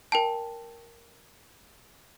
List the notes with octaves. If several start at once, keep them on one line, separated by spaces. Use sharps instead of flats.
A#4 G5 A5